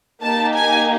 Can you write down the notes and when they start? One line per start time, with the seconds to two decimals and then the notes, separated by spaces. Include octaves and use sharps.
0.22 A#3 D#4 G4 A5
0.54 G#5